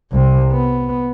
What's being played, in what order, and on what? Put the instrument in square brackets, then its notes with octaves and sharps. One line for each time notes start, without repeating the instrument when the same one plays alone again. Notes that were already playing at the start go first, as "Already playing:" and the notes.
[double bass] C2 C3
B3